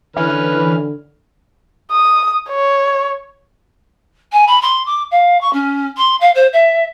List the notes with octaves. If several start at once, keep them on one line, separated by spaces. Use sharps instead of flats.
D3 E3 C#4 B4 F6
D#6
C#5
G#5
B5
C6
D6
F5
C#6
C#4
C6
F5
C5
E5